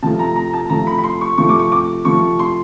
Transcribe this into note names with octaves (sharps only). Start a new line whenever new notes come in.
C3 F3 A3 A5
A#5
A#5
A5
C3 F3 A3 A#5
B5
B5
C6
C#6
C3 F3 A3 C#6
D6
C#6
D6
C3 F3 A3 C#6
C6